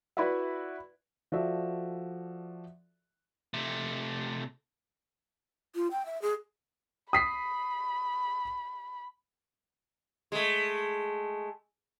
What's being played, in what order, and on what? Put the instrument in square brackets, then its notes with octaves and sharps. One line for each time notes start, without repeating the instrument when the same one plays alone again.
[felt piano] E4 F#4 B4 D5 E5
[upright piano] F3 F#4 A4 D5 E5
[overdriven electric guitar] C3 A3
[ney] F4
G5
E5
G#4
[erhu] B5 [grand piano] D#6 B6 C7
[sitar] G#3 A3